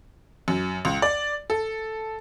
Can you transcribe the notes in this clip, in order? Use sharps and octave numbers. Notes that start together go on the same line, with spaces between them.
F#2
C#2
D5
A4